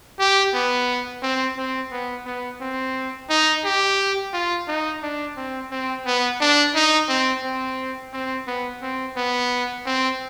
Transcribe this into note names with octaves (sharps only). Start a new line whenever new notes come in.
G4
B3
C4
C4
B3
B3
C4
D#4
G4
F4
D#4
D4
C4
C4
B3
D4
D#4
C4
C4
C4
B3
C4
B3
C4